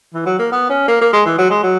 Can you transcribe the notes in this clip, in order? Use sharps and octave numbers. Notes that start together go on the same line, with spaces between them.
E3
F#3
A#3
B3
C#4
A#3
A#3
G#3
E3
F#3
G#3
F#3